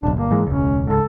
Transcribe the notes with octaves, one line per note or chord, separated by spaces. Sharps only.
D1 B1 D4
G1 A#3
G#2 E3 G#3
E1 C#2 C#4
C#2 G#2 A4